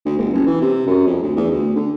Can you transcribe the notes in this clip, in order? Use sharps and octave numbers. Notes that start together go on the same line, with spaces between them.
D2
G1
F#1
E3
C3
F#2
F2
D2
E2
D2
D3